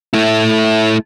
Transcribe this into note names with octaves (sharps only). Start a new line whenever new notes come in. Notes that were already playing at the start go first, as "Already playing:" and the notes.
A3 E4